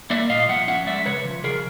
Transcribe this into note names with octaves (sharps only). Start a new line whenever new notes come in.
A#3 D5 E5
A#2 D#5 F5
F3 E5 F#5
C#4 E5 F#5
G#3 D5 E5
C#3 B4 C#5
F3
C#3 G#4 A#4